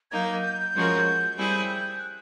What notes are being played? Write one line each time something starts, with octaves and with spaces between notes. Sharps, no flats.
F#3 A#3 D#4 G6 G#6
G6
F3 G#3 C#4 F#4 A#4
G3 C4 E4 G#4
G6
F#6